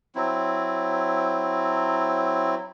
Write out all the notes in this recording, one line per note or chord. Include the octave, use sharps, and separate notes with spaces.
F#3 C4 E4